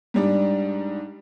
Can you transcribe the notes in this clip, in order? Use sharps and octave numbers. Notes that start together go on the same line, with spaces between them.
G#2 G3 D4